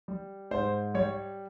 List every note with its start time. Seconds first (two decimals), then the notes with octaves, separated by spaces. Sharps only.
0.08 G3
0.51 G#2 C5
0.94 G3 C#5